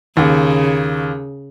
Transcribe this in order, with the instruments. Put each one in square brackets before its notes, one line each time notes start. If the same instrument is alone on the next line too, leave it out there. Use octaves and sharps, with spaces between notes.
[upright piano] D#2 [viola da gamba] C#3